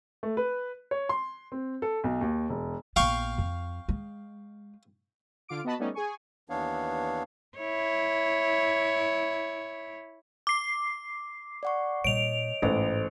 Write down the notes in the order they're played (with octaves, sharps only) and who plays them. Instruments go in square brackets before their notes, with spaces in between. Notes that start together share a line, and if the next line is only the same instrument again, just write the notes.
[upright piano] A3
B4
C#5
C6
C4
A4
B1
D#2
E1
[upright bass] A#1 B3 [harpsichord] F5 G5 C#6
[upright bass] F2
G#3
[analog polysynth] D3 F4 F5 D6 D7
B3 F#4 D#5 A5 B5
G3 A3 B3 C#4 D#4
G#4 G#5 C#6
[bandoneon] D#2 E3 B3 D4 C#5 F5
[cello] E4 C#5
[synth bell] D6 C7
[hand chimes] D5 F#5 C#6
[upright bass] A#2 G3 [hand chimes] C#5 D#5 [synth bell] D7 F7
[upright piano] A1 [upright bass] G#2 [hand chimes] A4 C5